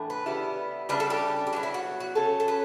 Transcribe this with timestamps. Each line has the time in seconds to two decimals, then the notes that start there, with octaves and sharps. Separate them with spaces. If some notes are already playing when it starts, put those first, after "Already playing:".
Already playing: A2 E3 A3 D4
0.10 B4
0.26 C#3 G3 B3 E4
0.89 C#3 G3 D4 B4
1.00 A4
1.10 G4
1.47 G4
1.53 F#3 B3 E4 F#4
1.63 E4
1.74 F#4
2.00 F#4
2.15 C#3 F#3 C#4 A4
2.40 A4
2.48 B4